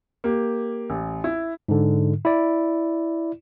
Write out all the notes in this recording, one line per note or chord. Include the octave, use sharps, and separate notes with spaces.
A#3 G4
A1
E4
G#2 D3
E4 D5